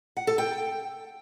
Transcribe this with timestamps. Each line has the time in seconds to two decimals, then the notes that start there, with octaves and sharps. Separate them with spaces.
0.17 F#5
0.27 A4
0.38 G5